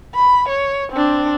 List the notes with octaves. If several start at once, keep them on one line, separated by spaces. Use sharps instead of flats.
B5
C#5
C4 D4